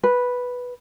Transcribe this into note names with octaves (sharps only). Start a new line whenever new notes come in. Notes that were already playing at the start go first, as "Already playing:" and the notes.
B4